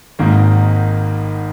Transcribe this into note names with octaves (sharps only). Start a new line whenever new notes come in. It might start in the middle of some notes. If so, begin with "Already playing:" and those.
G#1 G#2 D#3 A#3